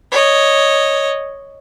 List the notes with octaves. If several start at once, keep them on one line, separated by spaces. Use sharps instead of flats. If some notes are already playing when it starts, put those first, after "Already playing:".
C#5 D#5